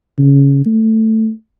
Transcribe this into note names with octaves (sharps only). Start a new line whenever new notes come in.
C#3
A3